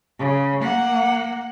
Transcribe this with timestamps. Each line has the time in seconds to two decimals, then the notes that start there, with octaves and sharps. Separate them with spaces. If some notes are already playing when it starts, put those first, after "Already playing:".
0.19 C#3
0.61 A#3 F#5